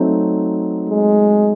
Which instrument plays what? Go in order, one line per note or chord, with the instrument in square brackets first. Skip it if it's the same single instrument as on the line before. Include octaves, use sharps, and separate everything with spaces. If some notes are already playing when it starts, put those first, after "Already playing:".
Already playing: [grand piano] F#3 A3 C4 D#4
[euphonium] G#3